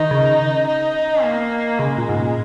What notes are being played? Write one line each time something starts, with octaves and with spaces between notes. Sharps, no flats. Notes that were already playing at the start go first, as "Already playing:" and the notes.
Already playing: D#3 D#4
C#3
D#4
A#3
C#3 G#3
A#2
G#2
A#2